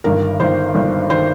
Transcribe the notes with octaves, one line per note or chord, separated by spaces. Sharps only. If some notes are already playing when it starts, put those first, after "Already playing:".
G1 G2 D#3 A#4
G1 G2 D#3 C5
G1 G2 D#3
D#3 C5